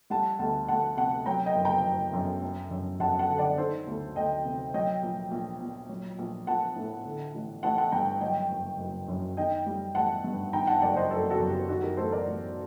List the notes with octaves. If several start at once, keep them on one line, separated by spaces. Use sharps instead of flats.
G3 F#5 A5
D2 F#5 A5
D2 F#5 A5
C3 F#5 A5
F#3 G5 A#5
D#5 G5
F#1
G5 A#5
F#1
F#2
F#3
F#2
F#2 F#5 A5
F#5 A5
D3
D5 F#5
D#3 A4 C5
D2
D2 D#5 G5
C3
F#3 D#5 G5
A#1
A#1
A#2
F#3
A#1
A#1 F#5 A5
A2
D3
A1
A1 F#5 A5
F#5 A5
G2 G5 A#5
F#3 D#5 G5
F#1
F#1
F#2
D#3 D#5 G5
G3
A1 F#5 A5
G2
D#3 G5 A#5
F#5 A5
F#1 D5 F#5
C5 D#5
F#1 A4 C5
F#4 A4
F#2
G4
D#3 F#4
G4 A#4
A1 A4 C5
A#4 D5
A1